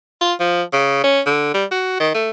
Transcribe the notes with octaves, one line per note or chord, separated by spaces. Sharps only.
F4
F3
C#3
C#4
D3
G3
F#4
D#3
A3